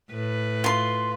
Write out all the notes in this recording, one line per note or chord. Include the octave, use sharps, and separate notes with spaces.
A2 B4
F4 C6